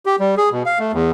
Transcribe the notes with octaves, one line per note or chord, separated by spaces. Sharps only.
G4
G3
G#4
B2
F5
A3
E2